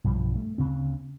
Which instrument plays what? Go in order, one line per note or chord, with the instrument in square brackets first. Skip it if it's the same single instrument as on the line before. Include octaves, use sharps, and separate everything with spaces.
[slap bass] B1 G2 F3 G3
A3
D2 C#3 C4